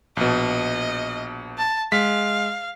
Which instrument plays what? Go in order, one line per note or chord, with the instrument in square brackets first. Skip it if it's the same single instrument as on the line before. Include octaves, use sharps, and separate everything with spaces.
[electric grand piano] A#1 B2 [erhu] D#5
[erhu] A5
[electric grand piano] G#3 B6 [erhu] F5